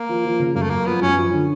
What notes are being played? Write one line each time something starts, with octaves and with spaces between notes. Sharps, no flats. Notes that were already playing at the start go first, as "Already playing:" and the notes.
Already playing: A#3
F3
F3
C#3
F#2 A#3
A3
F#2 A#3
F3 B3
F#2 C#4
F3
D3